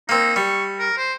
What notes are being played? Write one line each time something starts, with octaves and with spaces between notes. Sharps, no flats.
A#3 C4 D#4
G3 C#6
A#4
C5